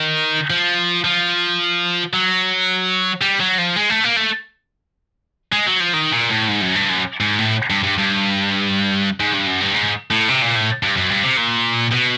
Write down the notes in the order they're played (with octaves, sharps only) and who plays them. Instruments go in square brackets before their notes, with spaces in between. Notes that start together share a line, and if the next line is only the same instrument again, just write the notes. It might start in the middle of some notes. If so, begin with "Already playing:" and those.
Already playing: [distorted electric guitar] D#3
F3
F3
F#3
G3
F#3
F3
G#3
A3
A#3
A3
G#3
F#3
F3
D#3
A#2
A2
G#2
F#2
G2
F#2
G#2
A2
G2
G2
G2
G#2
G2
F#2
G2
G#2
A2
C3
A#2
A2
G2
F#2
G2
C3
A#2
B2